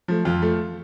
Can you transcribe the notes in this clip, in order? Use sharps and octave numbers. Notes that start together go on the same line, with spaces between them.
F3 A3
F2 F4
F3 A3